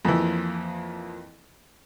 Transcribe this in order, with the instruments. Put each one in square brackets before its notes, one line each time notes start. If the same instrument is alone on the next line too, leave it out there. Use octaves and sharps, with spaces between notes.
[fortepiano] F2 E3 [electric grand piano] F3 A#3